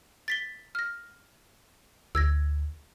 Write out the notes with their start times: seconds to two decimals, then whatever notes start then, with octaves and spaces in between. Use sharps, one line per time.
0.28 A6 B6 G7
0.75 F6 A#6
2.15 D2 E6 G#6 A#6